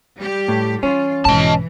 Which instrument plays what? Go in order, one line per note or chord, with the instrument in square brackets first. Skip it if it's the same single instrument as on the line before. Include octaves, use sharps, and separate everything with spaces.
[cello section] G3 G4
[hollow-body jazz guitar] A2
[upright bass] E3 [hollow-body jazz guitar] C#4 [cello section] F4
[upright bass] B1 G#2 [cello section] E3 [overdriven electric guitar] D#5 A5